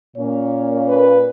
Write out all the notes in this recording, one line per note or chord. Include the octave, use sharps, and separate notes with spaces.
A#2 A#3 C#4 C#5
B4